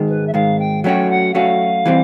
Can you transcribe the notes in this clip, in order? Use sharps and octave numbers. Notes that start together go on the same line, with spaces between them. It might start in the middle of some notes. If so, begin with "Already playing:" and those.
Already playing: G#2 D#3 G#3
B4
E5
G#2 D#3 G#3 F5
G5
F#3 A3 C#4 F#4 G5
F#5
F#3 A3 C#4 F#4 F5
E3 G3 C4